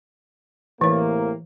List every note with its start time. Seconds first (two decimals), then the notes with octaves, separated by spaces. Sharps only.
0.81 A2 C3 E3 A#3 C#5